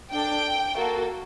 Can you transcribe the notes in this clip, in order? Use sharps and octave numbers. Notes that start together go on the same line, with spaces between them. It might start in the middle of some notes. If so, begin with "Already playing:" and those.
D4 A4 G5
A#3 F#4 A4